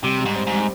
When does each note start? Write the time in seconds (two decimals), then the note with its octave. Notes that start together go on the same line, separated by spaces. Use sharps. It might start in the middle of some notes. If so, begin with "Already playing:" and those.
0.04 C3 G3
0.20 G3
0.25 G#2
0.36 C4
0.47 G#2
0.52 G3